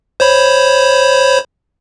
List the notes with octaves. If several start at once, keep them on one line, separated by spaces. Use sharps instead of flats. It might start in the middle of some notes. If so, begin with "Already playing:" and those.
C5 C#5 B5